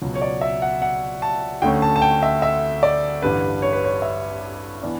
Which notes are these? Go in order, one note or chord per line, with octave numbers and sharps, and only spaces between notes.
C#2 B2 F#3
C#5
D5
E5
F#5
F#5
A5
D2 D3 A3 C#4 G5
A5
A5
G5
E5
E5
D5
A1 G2 D3 G3 D4 B4
C#5
B4
C#5
E5
E3 B3 D4